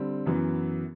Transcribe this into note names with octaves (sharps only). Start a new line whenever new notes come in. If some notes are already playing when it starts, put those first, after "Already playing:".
Already playing: D3 G3 C4
F#2 E3 B3